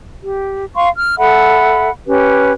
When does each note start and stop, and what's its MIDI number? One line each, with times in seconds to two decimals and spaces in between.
0.22 0.66 67
0.75 0.89 77
0.75 0.89 84
0.75 0.89 85
0.96 1.14 89
1.18 1.90 69
1.18 1.90 76
1.18 1.90 78
1.18 1.90 83
2.07 2.52 61
2.07 2.52 67
2.07 2.52 71